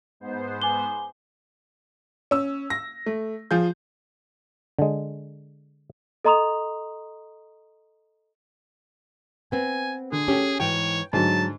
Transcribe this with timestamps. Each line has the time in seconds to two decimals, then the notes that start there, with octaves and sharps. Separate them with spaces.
0.20 G#2 B3 C5
0.62 G#5 D6 G7
2.31 C#4 E6
2.70 A#6
3.06 A3
3.51 F3 F4 G#4 G6
4.79 D3 G#3
6.25 A4 D#5 A#5 C6 D#6 F7
9.52 B3 C4 G#5
10.12 D3 G#4
10.28 C#4 G4 A4
10.60 G#2 E3 C#5 G5
11.13 G#2 D3 F#3 G#3 A5